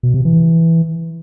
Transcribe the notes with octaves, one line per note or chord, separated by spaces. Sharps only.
B2
C3
E3